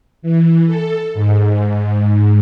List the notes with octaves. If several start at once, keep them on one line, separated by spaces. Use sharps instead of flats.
E3
A4
G#2